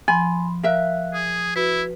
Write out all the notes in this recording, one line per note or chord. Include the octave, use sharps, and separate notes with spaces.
F3 G#5 B5 C6
A#4 E5 F5 F#6
G#4 D#6
E4 F#4 B4